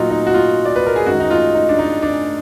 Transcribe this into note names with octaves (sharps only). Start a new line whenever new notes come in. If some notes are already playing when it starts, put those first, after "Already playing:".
Already playing: A#2 F#3 D#4 F4 F#4
D#4
F#4
F4
D5
B4
A#4
G#4
F#2 D#3 G#3 F#4
D#4
F4
D#4
D4
D#4
D4